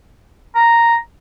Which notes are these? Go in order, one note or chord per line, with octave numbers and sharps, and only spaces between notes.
A#5